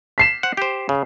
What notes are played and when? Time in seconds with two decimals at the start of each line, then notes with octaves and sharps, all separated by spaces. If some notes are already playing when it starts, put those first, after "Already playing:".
0.18 B6 C7 E7
0.43 C5 F#5
0.57 G4 C5
0.89 C#3